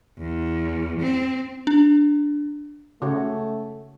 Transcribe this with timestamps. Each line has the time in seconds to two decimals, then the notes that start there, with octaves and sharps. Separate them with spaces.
0.18 E2
1.00 C4
1.67 D4
3.02 C#3 A3 F#4 C#5